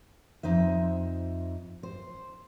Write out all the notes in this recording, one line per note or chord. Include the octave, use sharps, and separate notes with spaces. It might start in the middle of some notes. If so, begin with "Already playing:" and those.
F2 D#4 C5 E5
C5